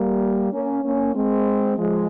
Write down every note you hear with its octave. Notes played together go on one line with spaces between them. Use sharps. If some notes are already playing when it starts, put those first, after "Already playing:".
Already playing: G3 A#3
A#3 C#4
A#3 C#4
G#3 C4
F3 G#3